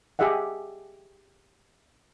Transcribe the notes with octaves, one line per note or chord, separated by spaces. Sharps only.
G4 G#4 D#5 E5 F#5